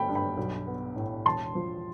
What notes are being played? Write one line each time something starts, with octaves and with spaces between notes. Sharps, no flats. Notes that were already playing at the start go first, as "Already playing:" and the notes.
Already playing: G1 A3 G5 B5
G2
G5 B5
B1
B3
A2
E1 A5 C6
F3